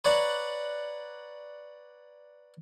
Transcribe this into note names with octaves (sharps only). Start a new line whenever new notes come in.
B4 C#5 D5 F#5 A#5